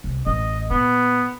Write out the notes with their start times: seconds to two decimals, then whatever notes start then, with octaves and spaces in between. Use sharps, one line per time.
0.04 C2
0.26 A1 D#5
0.71 A#2 B3